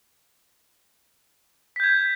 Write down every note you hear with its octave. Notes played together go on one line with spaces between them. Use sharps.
G6 G#6 B6